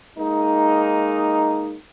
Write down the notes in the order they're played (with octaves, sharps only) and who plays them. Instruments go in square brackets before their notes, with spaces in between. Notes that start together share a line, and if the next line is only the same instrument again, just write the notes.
[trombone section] G#3 A#3 D#4